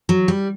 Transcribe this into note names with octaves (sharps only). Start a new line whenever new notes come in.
F#3
G3